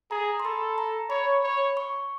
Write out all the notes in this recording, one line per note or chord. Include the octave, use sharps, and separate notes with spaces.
G#4 A#5
C6
A4 B5
A#5
C#5 B5
C#5
C#6